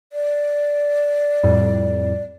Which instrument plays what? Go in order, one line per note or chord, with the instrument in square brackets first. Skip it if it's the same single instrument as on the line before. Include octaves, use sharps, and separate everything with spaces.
[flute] D5
[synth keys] F2 A2 G3